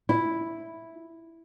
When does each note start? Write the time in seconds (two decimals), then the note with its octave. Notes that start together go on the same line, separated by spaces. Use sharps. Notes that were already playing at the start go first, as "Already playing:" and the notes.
0.09 E4